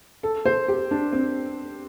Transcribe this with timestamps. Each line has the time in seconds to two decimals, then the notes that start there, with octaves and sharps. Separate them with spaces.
0.23 A4
0.46 C5
0.68 G4
0.91 D4
1.12 C4